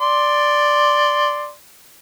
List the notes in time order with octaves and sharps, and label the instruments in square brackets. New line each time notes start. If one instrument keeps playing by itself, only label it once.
[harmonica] D5 C6